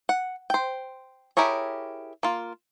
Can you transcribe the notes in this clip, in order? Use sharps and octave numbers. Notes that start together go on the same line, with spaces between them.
F#5
C5 G5
E4 G4 G#4 A#4 C#5
A#3 F4